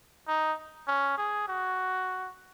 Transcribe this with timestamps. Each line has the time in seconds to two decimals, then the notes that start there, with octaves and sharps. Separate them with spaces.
0.28 D#4
0.88 C#4
1.18 G#4
1.48 F#4